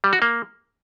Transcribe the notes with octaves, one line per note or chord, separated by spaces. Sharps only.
G3
F#4
A#3